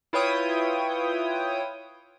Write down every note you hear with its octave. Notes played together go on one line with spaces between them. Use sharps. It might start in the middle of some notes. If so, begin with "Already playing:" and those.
E4 F4 B4 C#5 G5 D#6